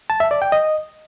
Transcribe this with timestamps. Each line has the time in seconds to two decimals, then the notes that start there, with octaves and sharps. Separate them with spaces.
0.10 A5
0.20 E5
0.31 D5
0.42 G5
0.52 D#5